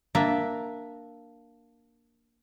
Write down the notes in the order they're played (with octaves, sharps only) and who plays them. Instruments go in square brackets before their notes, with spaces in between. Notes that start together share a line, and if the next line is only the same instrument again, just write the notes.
[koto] A#3 D4 E5